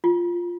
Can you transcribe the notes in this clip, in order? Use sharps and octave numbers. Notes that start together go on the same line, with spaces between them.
F4